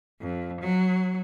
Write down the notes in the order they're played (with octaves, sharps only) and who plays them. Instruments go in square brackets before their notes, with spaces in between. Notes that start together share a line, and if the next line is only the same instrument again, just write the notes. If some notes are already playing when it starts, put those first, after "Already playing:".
[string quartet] F2
F#3